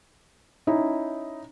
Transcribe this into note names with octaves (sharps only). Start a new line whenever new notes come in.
C#4 D#4 E4